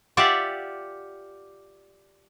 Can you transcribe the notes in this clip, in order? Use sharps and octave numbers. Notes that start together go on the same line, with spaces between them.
F4 G4 D5 E5 F#5